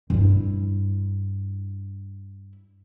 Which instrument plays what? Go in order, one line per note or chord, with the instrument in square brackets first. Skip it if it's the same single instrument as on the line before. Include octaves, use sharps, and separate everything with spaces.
[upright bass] G2 E4